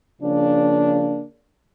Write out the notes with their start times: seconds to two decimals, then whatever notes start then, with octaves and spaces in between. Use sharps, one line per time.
0.22 C#3 F3 A#3 D4